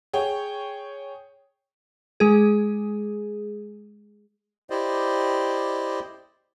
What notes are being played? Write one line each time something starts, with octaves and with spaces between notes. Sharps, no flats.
G#4 C#5 G5
G#3 G#4
E4 G4 C5 D5 D#5